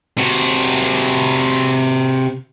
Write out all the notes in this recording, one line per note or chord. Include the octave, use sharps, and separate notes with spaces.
C3 F#4